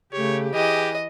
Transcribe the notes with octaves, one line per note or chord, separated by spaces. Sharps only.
C#3 A3 G4 C#5
E3 G4 G#4 D#5